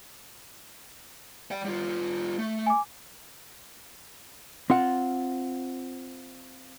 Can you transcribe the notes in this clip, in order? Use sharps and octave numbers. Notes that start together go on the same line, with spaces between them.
D5 G5
G3 F4
A3
G#5 D6
C4 F4 F#5